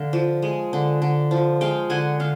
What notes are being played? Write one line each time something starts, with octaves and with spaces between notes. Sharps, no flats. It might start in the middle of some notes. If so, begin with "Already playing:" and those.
Already playing: D3 F5
F3
G#3
D3
D3
F3
G#3 F5 G5
D3 F#5 G#5
D3 F5